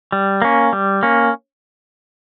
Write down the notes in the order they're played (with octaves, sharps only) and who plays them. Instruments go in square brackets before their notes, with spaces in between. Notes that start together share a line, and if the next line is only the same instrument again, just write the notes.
[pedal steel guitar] G3
A#3 C#4
G3
A#3 C#4